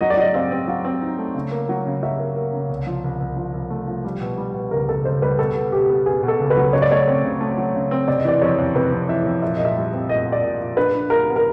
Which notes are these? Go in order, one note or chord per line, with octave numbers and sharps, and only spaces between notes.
F#3 D#5
D5
F#3 D#5
C4 F5
C4
F#3 F5
C4
D#4
A3
C#3
A#3
F#3
C#3
F#3 E5
A#3
A#3
C#3
C2
F3
C2
C2
F3
C2
A3
F3
G3
B2
G3
B2
C#2 A#4
C#2 A4
C#2 C5
G3 B4
B2 A4
B3
B2 G4
B3
B3 G#4
B2
A4
C#2
B4
F#3
C#3 C#5
D5
A3 C#5
C4
C#3
A3
F#3
C#3
C4
C3 D5
D#5
E3 D5
F2 C#5
F2
C3 B4
F2
E3 E5
F2
A#2 E5
A#2 D#5
E5
G3
C4
A#2 D#5
A#2
D5
A#2
A#2
D4 B4
D4
F4 A#4
B3
A#4